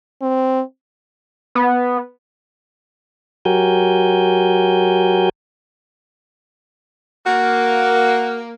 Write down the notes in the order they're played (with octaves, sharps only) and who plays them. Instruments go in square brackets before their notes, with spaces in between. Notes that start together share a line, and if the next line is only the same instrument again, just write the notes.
[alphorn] C4
[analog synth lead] B3
[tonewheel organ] F#3 F#4 G4 A#4 G#5 G6
[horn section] A#3 [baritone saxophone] F#4